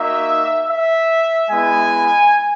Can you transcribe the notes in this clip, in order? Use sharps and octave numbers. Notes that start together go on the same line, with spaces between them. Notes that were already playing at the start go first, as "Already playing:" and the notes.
Already playing: A#3 D#4 F#4 E5
E5
G#3 B3 E4 G#5